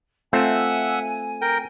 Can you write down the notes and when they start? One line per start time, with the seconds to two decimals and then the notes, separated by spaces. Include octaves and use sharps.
0.33 A3 C4 F4 E5 F#5 G#5 E6
1.42 A#4 G5